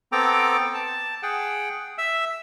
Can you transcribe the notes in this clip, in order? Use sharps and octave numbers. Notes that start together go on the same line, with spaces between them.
B3 C4 A4 G5 A#5 D6
A5
G#4 F#5 G5
E5 E6